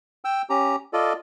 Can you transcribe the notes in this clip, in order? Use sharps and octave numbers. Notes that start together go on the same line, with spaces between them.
G5 E6
C#4 G4 A#5
F4 A4 D5 D#5